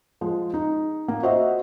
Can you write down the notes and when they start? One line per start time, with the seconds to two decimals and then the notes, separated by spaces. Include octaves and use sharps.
0.21 F3 G#3
0.54 D#4
1.08 A#3
1.23 F#4 C5 D#5 E5 F#5